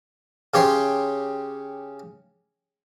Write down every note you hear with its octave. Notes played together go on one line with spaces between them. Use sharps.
C#3 G4 C#5 C6